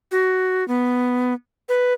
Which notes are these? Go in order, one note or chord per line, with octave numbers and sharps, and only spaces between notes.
F#4
B3
B4